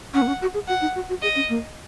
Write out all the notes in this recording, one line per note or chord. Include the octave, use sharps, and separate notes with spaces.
C#4 F#5
A#3
C#4
F#4
G#4
F#4 F#5
D#4
F#4
F#4
G#4 D#5
C#4
A#3